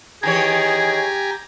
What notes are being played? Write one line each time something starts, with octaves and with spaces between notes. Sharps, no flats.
D#3 E3 G4 G#4 C#5 G#5 A#5